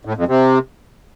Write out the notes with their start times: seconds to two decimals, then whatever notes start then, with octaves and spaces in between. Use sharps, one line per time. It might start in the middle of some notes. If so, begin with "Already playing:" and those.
0.05 A2
0.16 F2
0.28 C3